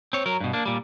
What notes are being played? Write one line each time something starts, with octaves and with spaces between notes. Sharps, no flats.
C4 C#5
F#3 A#4
G2 B2
A#3 D4
A#2 G3